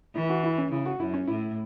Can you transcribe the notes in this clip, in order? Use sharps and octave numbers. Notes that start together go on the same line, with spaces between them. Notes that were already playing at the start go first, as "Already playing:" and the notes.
E3 E4
F#4
E4
C#4
C#3 E4
F#4
F#2 E4
C#4
A2 E4